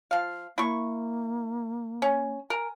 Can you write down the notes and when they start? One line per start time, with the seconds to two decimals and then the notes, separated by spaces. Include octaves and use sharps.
0.11 F3 F5
0.58 A#3 E4 C#6
2.02 C#4
2.50 A#4 G#5